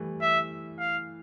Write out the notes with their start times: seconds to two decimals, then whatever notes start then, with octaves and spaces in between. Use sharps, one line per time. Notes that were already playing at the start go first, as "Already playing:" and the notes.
Already playing: E3 G3 A3
0.21 E5
0.80 F5